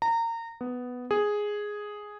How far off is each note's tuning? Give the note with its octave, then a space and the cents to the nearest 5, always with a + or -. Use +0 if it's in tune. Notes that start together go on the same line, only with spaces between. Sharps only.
A#5 -25
B3 +5
G#4 +0